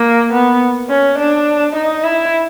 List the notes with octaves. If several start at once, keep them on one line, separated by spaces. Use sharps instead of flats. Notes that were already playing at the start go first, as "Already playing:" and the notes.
Already playing: A#3
B3
C#4
D4
D#4
E4